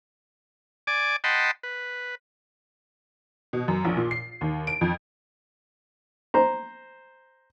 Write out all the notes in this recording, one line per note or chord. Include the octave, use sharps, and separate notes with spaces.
D5 G#5 D6
D#5 F#5 G5 A5 B5 C6
B4
B2
F#2
A#1
A#2
C7
D#2
D7
F2
C5 A#5